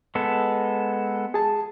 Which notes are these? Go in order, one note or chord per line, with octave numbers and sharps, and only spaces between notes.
G#3 B3 A4
G#4 A5